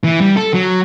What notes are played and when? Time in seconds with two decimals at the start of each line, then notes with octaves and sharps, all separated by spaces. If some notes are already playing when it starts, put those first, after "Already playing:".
0.04 E3
0.21 G3
0.37 A4
0.54 F#3